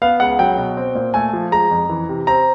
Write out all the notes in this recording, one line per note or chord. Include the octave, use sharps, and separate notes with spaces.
B3 F5
C#2 F#5
F#3 G5
B2
C4
A#2
A3 G#5
F3
G#3 A#5
F2
E3
C3
C4 A#5